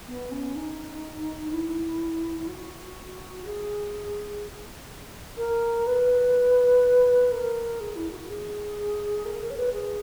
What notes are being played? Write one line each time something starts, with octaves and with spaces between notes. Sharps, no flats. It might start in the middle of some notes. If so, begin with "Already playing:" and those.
B3
C#4
D#4
E4
E4
F#4
G#4
A#4
B4
A#4
G#4
E4
F#4
G#4
A#4
A#4
C#5
B4
G#4